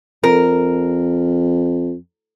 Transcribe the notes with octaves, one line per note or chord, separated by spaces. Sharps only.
F2 A#4